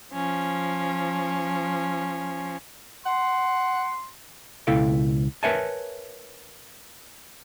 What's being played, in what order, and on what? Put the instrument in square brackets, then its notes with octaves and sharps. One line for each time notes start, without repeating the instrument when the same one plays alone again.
[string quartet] F3 C#4
[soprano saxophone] F#5 [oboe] C6
[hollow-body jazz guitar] C#2 B2 E4 A4 F5 G5
A#4 B4 C#5 E5 G#5 A5